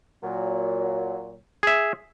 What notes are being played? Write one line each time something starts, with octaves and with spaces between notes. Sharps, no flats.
A#2 F#3
G#4 E5